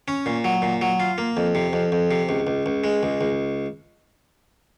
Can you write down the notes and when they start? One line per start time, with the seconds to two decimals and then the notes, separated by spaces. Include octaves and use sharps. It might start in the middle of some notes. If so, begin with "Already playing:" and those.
0.08 C#4
0.26 A#2
0.44 F#3
0.62 A#2
0.81 F#3
1.00 F4
1.18 A#3
1.37 F2
1.55 C3
1.73 F2
1.92 F2
2.11 C3
2.29 C#2
2.47 C#2
2.66 C#2
2.84 G#3
3.03 C#2
3.21 C#2